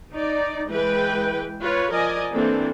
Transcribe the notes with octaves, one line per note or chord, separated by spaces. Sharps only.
D#4 D5
E3 G#3 B4 G5
F4 B4 C#5
F3 A#4 D5 D#5 G#5
E3 A#3 C4 D4 A4